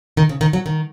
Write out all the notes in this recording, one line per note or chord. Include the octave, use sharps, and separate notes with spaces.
D#3
C#3
D#3
F#3
D#3